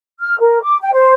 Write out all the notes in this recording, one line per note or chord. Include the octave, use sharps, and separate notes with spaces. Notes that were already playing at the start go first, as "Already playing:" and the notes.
F6
A#4
D6
G5
C5